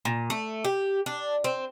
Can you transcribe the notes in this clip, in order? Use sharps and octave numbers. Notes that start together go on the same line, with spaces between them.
A#2
A3
G4
D4
C4